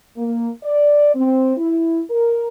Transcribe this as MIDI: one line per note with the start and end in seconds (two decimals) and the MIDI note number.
0.17 0.48 58
0.63 1.13 74
1.15 1.54 60
1.57 2.01 64
2.10 2.48 70